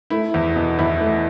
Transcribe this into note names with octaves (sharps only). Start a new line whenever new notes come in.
A3 E4
E2
B2
E2 E4
A3